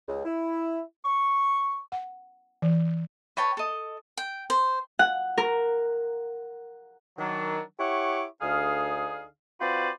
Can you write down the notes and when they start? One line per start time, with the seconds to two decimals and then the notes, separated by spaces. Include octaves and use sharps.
0.08 C#2
0.25 E4
1.05 C#6
1.92 F#5
2.62 E3
3.37 B4 C#5 G5 A5
3.57 A4 D#5
4.17 G5
4.50 C5
4.99 F#5
5.38 A#4
7.18 D#3 F#3 D4
7.79 E4 G4 C#5 F#5 C#6 D6
8.42 D2 D3 D#4 G#4 F5
9.61 C4 F4 F#4 B4 C5 D5